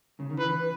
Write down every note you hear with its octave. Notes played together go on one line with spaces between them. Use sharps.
C#3
D#3
E3 B4